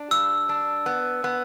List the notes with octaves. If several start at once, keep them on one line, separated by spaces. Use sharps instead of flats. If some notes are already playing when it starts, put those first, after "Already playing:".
Already playing: D4
G2 E6
D4
B3
B3